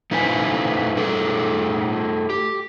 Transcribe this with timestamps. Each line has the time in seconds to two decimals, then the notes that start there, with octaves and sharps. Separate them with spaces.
0.11 A3 D#4 E4 B4 C5 G#5
0.97 A3 D#4 G#4 A4
2.30 G4